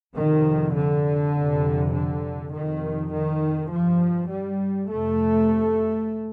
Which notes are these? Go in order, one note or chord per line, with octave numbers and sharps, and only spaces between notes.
F2 C3 D#3
D3
F2 C3
D3
F2 C3 D#3
D#3
G2 F3
G3
F2 C3 A3